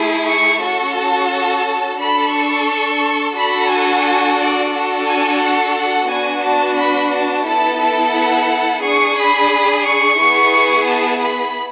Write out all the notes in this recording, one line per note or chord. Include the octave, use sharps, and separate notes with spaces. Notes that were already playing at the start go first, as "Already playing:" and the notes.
Already playing: A3 E4 G#4
C#6
C#4 F#4 A4 C#6
A5
A5
D4 A4 B5
C#6
D4 F#4 A4 B5
G#5
D5
D4 F#4 A4
G#5
F#5
F#5
B3 D4 F#4 G#5
A5
B5
A5
B3 E4 A4 A5
A5
F#5
D4 G#4 C#6
B5
C#6
B3 E4 G#4
A5
B5